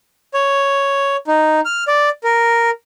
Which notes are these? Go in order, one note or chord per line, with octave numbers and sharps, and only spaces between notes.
C#5
D#4
F6
D5
A#4